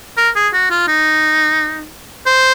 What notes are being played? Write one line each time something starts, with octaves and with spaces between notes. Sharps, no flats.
A#4
G#4
F#4
F4
D#4
C5